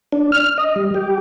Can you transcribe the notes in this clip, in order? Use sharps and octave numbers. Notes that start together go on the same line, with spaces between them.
D4
F6
D#5
G3
G4